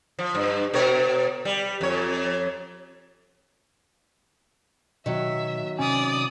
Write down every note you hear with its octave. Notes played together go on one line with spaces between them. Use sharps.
F3
G2
B2 A#4 C#5
G3
F2 C#5
B2 D#3 F#3 E5
C3 C#4 D5 G#5 D#6